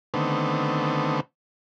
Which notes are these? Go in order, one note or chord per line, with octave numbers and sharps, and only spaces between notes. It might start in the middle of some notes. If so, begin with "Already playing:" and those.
D3 D#3 A3 B3 C4